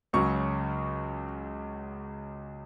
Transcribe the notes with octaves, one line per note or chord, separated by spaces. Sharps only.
C#2 C#3 F#3 C#6